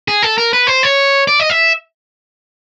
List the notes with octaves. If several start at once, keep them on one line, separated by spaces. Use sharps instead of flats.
G#4
A4
A#4
B4
C5
C#5
D5
D#5
E5